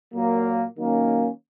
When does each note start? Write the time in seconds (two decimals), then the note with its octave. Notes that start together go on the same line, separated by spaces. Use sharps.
0.14 A#2 F#3 A#3
0.78 D#3 F#3 A#3 C#4